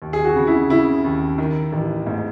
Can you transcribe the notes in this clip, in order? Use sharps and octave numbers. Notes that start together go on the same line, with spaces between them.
D#2
G#4
F#4
C#3
E4
C#3 E4
D#2
D#3
A1
G#2